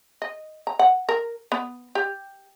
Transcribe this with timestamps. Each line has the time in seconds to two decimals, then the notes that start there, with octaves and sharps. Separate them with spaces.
0.22 D#5
0.67 A#5
0.79 F#5
1.09 A#4
1.52 B3
1.95 G4